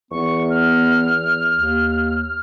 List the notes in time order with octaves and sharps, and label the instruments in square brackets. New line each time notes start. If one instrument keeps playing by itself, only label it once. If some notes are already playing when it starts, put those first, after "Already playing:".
[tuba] E2 [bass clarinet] B3 [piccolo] C#6
[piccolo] F6
[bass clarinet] D#2